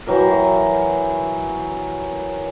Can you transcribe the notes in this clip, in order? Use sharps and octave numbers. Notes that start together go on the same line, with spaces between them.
E3 F#3 G4 A#4